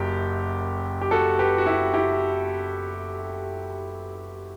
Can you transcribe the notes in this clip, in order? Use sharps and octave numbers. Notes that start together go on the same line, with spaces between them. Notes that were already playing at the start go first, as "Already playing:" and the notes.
Already playing: F#1 F#2 F#3 G4
G4
F#4 A4
G4 B4
F#4
E4 G4
E4 G4